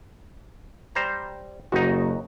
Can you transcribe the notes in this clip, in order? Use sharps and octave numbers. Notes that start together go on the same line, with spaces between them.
G3 C5 A#5
F#1 D#2 D#4 F#4